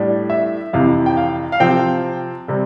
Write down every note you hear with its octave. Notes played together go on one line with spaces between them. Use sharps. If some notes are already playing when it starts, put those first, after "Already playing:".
Already playing: A2 G3 D4
E5
F2 C3 E3 F5
G5
F5
F5
C3 F3 C4 G5
C3 G3 C4